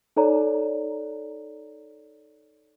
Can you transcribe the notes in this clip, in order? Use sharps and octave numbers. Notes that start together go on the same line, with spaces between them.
D#4 A4 C#5 D5 A#5